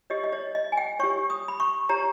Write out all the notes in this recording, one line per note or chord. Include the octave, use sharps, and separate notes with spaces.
G4 C#5 D#5
D#5
C#5
D#5
G#5
G5
G4 C#5 C#6
D#6
B5
C#6
G4 C#5 A#5